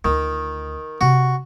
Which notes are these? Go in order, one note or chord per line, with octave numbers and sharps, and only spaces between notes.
D2 D#3 F4
C3 F#4